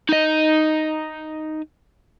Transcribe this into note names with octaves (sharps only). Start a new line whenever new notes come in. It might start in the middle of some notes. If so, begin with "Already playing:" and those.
D#4 D#5